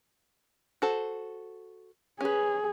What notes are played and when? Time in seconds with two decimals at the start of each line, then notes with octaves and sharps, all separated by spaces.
0.82 F#4 A4 C5
2.21 C#4 G#4 B4